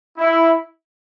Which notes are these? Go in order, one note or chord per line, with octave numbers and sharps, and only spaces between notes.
E4